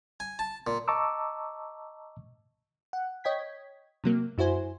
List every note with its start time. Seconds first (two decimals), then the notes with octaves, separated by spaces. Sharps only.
0.20 G#5
0.39 A5
0.67 A#2
0.88 D#5 A5 A#5 C#6 D6 E6
2.93 F#5
3.24 C#5 D#5 G5 G#6 B6
4.04 C3 F#3 A#3
4.38 F#2 E4 F#4 C5 G#5